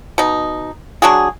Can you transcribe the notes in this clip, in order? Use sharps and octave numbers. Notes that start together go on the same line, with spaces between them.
B2 D#4
F#3 D4 F#4 G#4